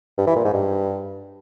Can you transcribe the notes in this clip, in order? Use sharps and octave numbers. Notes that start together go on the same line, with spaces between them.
G2
E3
A#2
G#2
G2